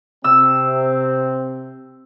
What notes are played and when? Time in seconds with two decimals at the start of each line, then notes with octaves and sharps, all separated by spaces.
0.24 C3 C4 E6